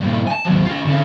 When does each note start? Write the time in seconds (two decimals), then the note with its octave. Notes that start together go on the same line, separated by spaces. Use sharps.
0.01 G2 A#2
0.27 G#5 A5
0.45 D#2 F#3
0.65 F4 G#4
0.86 D3 C#4